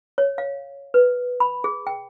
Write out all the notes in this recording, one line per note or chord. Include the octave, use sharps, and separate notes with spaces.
C#5
F5
B4
B5
G#4
G5